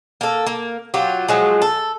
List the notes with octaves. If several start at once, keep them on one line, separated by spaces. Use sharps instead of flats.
A#3 A4
A#3
F#3 F4 G4
F3 F#3 G#3
A4